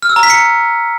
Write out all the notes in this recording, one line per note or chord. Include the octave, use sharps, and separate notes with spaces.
F6
E6
A#5
B6
C#7